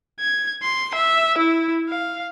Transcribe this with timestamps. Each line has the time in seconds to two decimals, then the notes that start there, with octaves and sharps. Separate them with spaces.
0.20 G#6
0.63 C6
0.95 E5
1.38 E4
1.89 F5